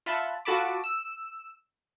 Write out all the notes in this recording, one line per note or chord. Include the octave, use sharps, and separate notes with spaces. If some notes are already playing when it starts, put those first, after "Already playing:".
F4 E5 F#5 A5 B5
F4 F#4 A4 A5 B5 D6
E6